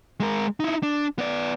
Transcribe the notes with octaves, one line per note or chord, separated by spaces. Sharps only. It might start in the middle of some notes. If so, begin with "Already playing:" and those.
G#3 A#4
D#4 E4
D4
B3 D5